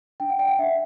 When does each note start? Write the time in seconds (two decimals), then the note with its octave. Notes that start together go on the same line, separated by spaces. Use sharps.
0.20 D4 G5
0.30 F#5
0.39 D5 G5
0.49 F#5
0.59 D4 E5